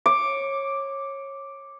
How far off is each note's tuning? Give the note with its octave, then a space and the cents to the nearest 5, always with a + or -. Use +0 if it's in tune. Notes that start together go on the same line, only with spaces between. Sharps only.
C#5 -20 D6 +0